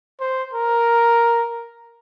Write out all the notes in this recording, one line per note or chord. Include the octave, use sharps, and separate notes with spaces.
C5
A#4